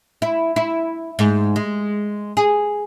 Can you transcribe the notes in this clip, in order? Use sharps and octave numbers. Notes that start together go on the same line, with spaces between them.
E4
E4
G#2
G#3
G#4